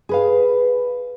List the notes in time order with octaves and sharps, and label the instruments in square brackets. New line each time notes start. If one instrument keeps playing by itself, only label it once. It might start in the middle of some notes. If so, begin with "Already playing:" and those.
[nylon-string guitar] G#4 B4 F5